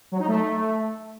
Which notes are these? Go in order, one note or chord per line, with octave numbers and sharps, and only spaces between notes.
F#3
D#4
A3